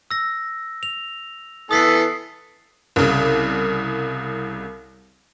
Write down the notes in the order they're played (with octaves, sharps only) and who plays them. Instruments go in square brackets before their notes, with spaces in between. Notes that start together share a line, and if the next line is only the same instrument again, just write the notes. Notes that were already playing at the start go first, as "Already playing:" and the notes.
[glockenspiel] E6 A#6
F7
[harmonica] E3 B3 A4 [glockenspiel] D#6 B6 C7
[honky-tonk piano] C2 C#3